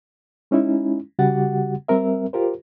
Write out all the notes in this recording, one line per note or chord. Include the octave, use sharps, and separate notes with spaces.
G#3 C#4 D#4 E4
C#3 G3 F#4 G4 F#5 A6
G3 C4 A#4 E5
F4 G4 A#4 C5